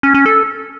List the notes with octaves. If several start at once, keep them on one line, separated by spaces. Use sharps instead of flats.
C#4
C#4
A4